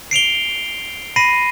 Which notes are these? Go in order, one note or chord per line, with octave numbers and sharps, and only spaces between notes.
C7 D7 F7 G7
B5 A#6 C7 D#7